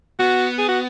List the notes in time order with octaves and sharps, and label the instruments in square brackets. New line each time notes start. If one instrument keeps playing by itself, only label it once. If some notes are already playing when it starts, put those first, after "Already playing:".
[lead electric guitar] B3 [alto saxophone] F#4
[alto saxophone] G#4
F#4